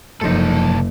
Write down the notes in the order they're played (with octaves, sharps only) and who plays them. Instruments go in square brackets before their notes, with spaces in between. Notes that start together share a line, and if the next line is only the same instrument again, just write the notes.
[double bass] F#1 [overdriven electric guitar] C2 A4 [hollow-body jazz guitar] G#2 F3 D#4